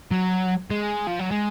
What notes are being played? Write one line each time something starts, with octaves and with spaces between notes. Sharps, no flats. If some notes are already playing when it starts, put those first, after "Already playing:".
F#3
G#3
F3
F#3
G#3